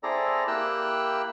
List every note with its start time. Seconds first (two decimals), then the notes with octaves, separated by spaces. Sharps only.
0.03 C4 E4 G#4 A4 D5 A#5
0.48 A#3 E4 G4 G5 E6 F#6